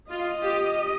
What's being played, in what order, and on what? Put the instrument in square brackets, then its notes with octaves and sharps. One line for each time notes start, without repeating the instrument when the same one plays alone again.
[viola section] F4 [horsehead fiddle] D#5
[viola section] G4